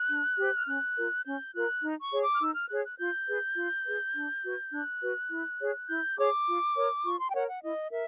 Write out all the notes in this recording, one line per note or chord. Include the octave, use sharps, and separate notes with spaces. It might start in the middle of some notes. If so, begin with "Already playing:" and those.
Already playing: F#6
D4
G4 C5
F6
C#4 F#6
F4 A#4
C#4 G6
F4 A#4 F#6
D#4
C#6
G#4 C#5
D6
F6
D#4 E6
F6
G#4 C#5 F#6
F#6
F4 G6
G#4 B4
F4
G#4 B4
D4
F#4 B4
D4 F#6
F#4 B4
E4
G#4 C#5
E4 G6
G#4 C#5 D6
F4
A#4 C#5
F4 C#6
C6
G5
A#4 C#5 F#5
F#5
E4 D#5
A#4 E5